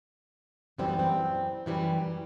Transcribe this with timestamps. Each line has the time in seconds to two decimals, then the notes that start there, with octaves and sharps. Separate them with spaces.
0.78 F#2 E3 G3 C4
0.89 B3
0.99 C4
1.66 F#2 E3 G3